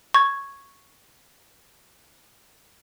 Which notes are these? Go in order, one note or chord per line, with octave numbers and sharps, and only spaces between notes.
C#6 G#6